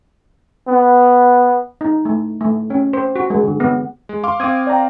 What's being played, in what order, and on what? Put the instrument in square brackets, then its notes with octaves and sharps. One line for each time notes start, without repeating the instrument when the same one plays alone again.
[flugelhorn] B3
[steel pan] D#4
A3
A3
C#4
C5
F#4
G#3
D3
B3
[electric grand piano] G#3
F5 C6 D6
[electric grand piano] C4 F5 [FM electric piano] D6 D#6 G#6
[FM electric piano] D5 G5 A#5